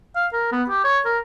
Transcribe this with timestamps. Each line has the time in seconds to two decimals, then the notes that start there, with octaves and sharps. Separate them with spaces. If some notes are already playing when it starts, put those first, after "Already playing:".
0.16 F5
0.33 A#4
0.52 B3
0.69 G4
0.84 C#5
1.05 A#4